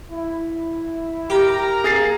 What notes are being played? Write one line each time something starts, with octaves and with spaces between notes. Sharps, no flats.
E4
G4 A#4 A#5
A#3 G#4 A6 C7